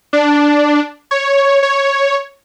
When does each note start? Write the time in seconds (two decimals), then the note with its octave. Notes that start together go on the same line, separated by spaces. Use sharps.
0.13 D4
1.11 C#5
1.63 C#5